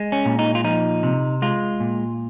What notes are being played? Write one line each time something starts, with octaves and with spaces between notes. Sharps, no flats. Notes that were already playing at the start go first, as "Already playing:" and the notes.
Already playing: G#3
C#4
A#2
D#4
F4
F3 D#4
C3
G#3 F4
A#2